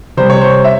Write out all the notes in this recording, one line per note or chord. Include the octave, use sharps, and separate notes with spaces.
C3 G3 C5
C#5
C5
E5